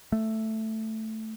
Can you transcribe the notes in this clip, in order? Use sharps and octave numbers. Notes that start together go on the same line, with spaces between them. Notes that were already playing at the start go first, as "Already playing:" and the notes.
A3